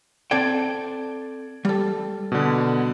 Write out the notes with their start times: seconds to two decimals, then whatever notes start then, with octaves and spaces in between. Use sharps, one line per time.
0.31 C4 A4 D5 G5 G#6 D7
1.65 G3 A4
2.32 B2 D3